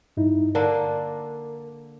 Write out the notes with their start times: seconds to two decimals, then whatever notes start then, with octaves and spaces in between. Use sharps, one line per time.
0.17 G2 D#4 E4
0.55 D3 A#3 D4 A#4